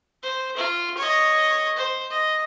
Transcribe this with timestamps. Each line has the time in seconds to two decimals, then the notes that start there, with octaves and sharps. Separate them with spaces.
0.23 C5
0.57 F4
0.97 C#5 D#5
1.77 C5
2.10 D#5